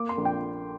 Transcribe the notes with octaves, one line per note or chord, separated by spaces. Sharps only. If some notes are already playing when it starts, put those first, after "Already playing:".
Already playing: A#3 D6
C6
A#1
G5